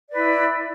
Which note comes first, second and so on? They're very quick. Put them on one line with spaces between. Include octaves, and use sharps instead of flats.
D5 B4 E4